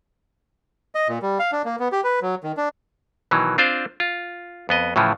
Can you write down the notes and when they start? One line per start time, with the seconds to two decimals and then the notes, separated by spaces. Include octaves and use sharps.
0.95 D#5
1.09 A#2
1.22 G3
1.39 F5
1.52 D4
1.65 A#3
1.79 B3
1.92 G4
2.04 B4
2.22 F#3
2.43 D#3
2.57 D4
3.31 B2 D#3 E3 F#3
3.58 C4 D4 F4 C5 D5
4.00 F4
4.69 F2 B3 D#5
4.96 A2 C#3 E3 F3